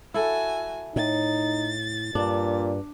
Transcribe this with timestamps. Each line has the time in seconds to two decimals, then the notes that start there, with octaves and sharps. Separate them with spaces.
0.14 E4 F#4 A4 G#5
0.96 A2 D#4 A6
2.15 G2 A#2 D4